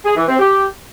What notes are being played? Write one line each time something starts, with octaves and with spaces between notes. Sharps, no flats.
G#4
E3
C4
G4